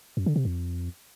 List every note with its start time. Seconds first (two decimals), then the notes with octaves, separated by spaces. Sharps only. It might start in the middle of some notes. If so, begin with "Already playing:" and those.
0.17 F#2
0.26 D3
0.36 C3
0.45 F2